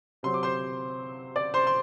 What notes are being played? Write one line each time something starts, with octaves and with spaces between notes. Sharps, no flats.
C3 F#3 C4 C6
D6
C5 C6
D5 D6
C5 C6
C6